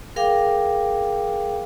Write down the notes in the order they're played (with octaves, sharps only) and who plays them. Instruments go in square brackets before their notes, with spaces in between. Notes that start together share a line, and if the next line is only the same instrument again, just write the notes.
[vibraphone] G#4 A#4 F5 G5 D6